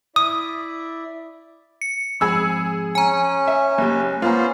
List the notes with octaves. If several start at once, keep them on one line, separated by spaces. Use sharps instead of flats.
E4 D5 E5 D#6
C#7
F2 G#2 G#4 B5 E6
C#4 G#5 A#5
E5
F#1 A#3 G4
A#3 B3 C#4 F4 C5 A#5